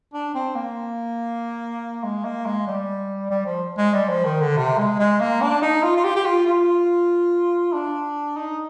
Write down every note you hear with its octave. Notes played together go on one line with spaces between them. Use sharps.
D4
C4
A#3
G#3
A#3
G#3
G3
G3
F3
G#3
G3
F3
D#3
D3
C3
G#3
G#3
A#3
D4
D#4
F4
F4
G4
G4
F4
F4
D4
D#4